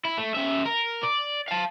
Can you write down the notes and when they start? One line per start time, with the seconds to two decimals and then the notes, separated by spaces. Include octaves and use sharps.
0.05 E4
0.18 A3
0.34 C#3 E5
0.65 A#4
1.03 D5
1.49 F5 A5